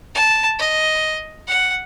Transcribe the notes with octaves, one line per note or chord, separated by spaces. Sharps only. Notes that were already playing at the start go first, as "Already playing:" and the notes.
A5
D#5
F#5